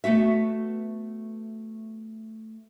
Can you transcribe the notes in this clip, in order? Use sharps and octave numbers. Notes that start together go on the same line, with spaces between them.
A3 B3 F#4 E5